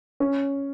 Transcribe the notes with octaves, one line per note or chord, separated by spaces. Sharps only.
C#4